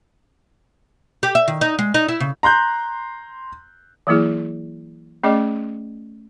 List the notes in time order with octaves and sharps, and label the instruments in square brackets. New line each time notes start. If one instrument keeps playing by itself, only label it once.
[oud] G4
E5
D#3
D#4
G#3
D#4
E4
C#3
[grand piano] A#5 C6 F#6 G6
[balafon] E3 F#3 A#3 E4 G#4
A3 C#4 G#4 D5 D#5 D6